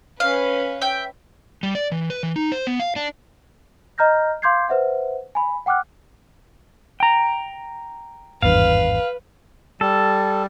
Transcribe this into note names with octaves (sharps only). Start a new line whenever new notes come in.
C#4 B4 F5
E5 G5
G3
D5
E3
B4
E3
D#4
C5
B3
F5
D4
D#5 A#5 F6 G6 A#6
F5 C6 D6 G6 G#6 C7
B4 C5 E5 F#5
G#5 B5
F#5 G5 D6 F6 F#6
G5 A#5
G#1 E2 G2 B4 F5
G3 A4